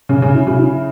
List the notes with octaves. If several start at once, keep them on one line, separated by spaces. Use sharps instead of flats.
C#3 C#4
C#3
E4
C#3 F#3
E4